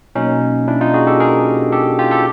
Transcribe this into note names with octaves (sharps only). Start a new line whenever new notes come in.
B2 F#3 A#3 C#4 D#4
D4 E4
D#4 F4
F#4 G#4
G4 A4
G#4 A#4
G4 A4
F4 G4
G4 A4